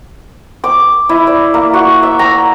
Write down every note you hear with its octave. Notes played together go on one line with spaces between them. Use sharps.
D6
E4
D5
A#3
F#4
E5
A#5